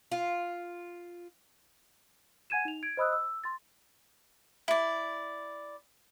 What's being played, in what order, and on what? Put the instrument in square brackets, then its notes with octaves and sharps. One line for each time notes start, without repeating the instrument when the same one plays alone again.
[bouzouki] F4
[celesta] F#5 G#5 G#6 D#7 E7
D#4 F7
G#6 D7
C5 D#5 B5 D#6 E6 F#6
E6
C6 A6
[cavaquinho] E4 D5